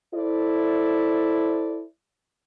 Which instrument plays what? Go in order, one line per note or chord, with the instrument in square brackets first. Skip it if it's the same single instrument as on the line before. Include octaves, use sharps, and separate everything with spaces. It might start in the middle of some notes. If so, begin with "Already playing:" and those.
[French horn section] E4 A4 C5 D5